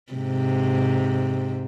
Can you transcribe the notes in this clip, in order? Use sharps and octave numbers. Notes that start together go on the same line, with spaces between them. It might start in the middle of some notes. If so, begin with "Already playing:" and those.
G#2 C3